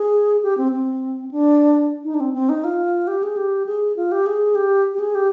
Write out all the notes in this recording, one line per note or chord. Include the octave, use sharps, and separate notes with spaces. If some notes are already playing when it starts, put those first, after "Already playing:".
Already playing: G#4
G4
C4
C4
D4
D#4
D4
C4
C4
D#4
F4
G4
G#4
G4
G#4
F4
G4
G#4
G4
G4
G#4
G4